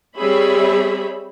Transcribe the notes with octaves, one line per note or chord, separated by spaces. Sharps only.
G3 C4 G#4 C#5 E5 B5